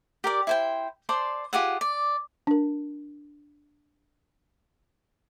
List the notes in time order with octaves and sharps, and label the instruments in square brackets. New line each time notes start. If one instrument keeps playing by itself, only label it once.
[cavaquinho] G4 A#4 D5
E4 C5 G5
C5 D5 A5 C6
F4 G4 G#4 F#5
D5
[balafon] D4 A#4